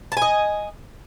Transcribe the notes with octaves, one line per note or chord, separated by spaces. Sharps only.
D#5 G#5 A5